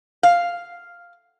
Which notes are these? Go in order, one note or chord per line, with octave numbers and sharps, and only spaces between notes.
F5